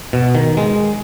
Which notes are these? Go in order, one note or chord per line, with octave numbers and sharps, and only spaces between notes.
B2
D#3
G#3